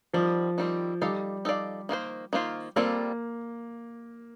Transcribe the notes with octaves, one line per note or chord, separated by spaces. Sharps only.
D#3 F3 G3 C4
D#3 G3 C4
G3 D#4 A4 D5 F5
D#4 A4 D5 F5
D#3 A#3 F4 C5
D#3 A#3 F4 C5
G3 A#3 C4 F4 A4 D5